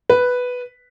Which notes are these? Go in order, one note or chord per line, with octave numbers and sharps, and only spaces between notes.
B4